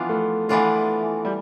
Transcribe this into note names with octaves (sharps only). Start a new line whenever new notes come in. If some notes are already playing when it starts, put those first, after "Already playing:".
Already playing: E3 F3 B3 D4 F4
A3
E3 A3 B3 D4 F4
G3